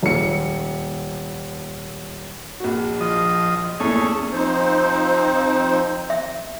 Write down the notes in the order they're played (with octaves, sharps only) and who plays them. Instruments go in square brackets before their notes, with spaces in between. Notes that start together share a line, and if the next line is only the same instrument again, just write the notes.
[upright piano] D#1 C#7
[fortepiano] A#1 F#4
[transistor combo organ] F3 D#5
[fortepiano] E2 A#2 [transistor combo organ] A3 C#4 G#4
[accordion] F3 C4 D#4 C5
[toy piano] E5